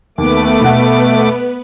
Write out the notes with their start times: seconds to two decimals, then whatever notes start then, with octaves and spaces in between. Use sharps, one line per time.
0.18 D#2 A3 B3 B4 D6
0.61 B2 F#5